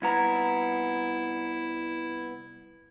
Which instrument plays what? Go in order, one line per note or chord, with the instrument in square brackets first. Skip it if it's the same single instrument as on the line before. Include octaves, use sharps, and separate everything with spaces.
[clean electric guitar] C2 B3 A#5 [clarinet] E4